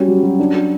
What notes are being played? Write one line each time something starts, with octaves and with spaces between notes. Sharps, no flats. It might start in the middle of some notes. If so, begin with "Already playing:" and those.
Already playing: G3 C#4 F#4
F#3
F#3
D4
F#4